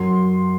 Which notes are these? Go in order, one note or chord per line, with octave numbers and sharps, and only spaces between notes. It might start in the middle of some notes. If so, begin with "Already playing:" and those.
Already playing: F#2 F#3 C6